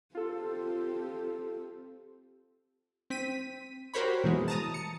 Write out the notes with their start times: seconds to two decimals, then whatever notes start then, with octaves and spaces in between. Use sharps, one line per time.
0.15 C4 F4 G4 A4
3.10 C4 B6 D#7
3.94 F#4 G4 A#4 C5 C#5 B5
4.24 B2 E3 G#3
4.48 A5 A#5 D#6
4.74 C#7